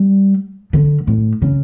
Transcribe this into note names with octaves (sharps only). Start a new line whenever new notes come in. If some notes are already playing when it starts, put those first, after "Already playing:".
Already playing: G3
D3
A2
C#3